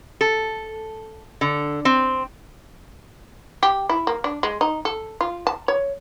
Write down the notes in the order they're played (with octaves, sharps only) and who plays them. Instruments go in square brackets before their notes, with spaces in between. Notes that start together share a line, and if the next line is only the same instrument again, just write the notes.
[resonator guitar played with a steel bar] A4
D3
C4
[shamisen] G4
E4
A#3
D4
G#3
D#4
A4
F4
A5
C#5